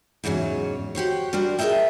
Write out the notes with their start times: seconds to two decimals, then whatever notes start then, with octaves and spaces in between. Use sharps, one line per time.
0.24 E2 G#2 C#3 F#3 C#4
0.95 F#4 G4 C5 C#5
1.33 G3 D4 F#4 A#4 C5
1.58 G#4 A#4 B4 D#5 E5 G5